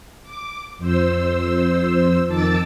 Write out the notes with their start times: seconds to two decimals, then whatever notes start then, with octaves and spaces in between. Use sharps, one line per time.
0.23 D6
0.78 F2 C5 E6
2.27 F2 D#3 A5 D6 E6 A6